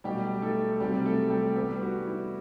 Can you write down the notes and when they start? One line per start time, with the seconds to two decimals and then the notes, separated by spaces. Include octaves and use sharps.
0.04 B2 F#3 G3 A3 G4
0.42 A3 A4
0.80 C3 F#3 G3 A3 C4 G4
1.06 A3 A4
1.30 G3 G4
1.56 E3 G3 B3 D4 G4
1.81 F#4
2.07 E4